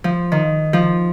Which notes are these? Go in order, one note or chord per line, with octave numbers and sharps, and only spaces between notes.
F3
D#3
F3